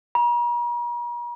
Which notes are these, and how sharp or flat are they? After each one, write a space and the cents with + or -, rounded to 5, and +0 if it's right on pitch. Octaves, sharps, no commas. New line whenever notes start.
A#5 +45